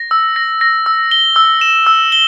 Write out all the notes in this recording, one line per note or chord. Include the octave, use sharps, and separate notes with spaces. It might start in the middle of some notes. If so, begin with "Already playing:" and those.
Already playing: A#6
E6
A#6
A#6
E6
G7
E6
E7
E6
G7